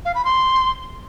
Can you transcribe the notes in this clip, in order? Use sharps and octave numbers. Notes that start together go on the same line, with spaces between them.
F5
B5
C6